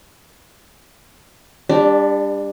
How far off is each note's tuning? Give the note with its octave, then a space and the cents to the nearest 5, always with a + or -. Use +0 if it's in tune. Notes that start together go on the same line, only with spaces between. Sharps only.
G3 +30 D4 +0